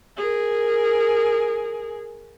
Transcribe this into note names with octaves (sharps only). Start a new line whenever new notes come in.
G#4 A#4